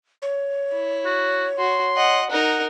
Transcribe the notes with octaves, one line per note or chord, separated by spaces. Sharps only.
C#5
E4
F#4
F#4 C6
D#5 F#5
D#4 A#4 F#5